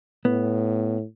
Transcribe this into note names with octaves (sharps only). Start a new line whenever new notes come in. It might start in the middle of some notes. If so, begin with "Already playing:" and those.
A2 B3